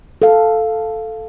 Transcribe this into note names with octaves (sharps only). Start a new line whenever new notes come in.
A4 F5